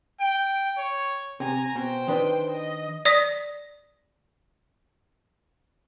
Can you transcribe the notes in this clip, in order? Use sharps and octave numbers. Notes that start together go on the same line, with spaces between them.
G5
C#5
C3 G#5 A#5
B2 C5 G5
D#3 D4 B4
D#5
D5 D#6 A#6 B6